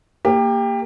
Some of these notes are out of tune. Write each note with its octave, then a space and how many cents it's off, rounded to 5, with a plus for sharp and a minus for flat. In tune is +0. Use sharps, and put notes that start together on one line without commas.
A#3 -15 G4 +20